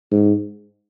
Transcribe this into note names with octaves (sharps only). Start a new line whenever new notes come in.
G#2